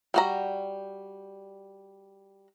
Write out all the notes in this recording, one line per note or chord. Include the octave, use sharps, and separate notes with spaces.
G3 F#4 A#5